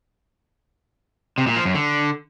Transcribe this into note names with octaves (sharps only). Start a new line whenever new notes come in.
C3
A#2
F3
F#2
D3